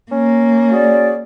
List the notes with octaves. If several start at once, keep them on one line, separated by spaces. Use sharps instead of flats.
A#3 C#4
F#4 G#4 D5